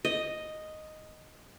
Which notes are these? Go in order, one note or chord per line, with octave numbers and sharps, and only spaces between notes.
D#5